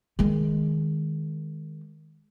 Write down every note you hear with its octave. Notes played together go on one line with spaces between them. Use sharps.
D#3 G#3